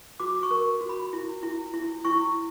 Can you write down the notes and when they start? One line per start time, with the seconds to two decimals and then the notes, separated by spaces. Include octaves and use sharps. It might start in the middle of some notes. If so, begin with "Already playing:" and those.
0.20 F#4 D6
0.43 C#6
0.51 A#4
0.81 F#4
0.89 B5
1.13 E4
1.43 E4
1.74 E4
2.05 E4 C#6